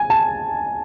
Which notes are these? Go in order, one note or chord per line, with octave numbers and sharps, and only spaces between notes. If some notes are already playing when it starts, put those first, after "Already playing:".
Already playing: G#5
A5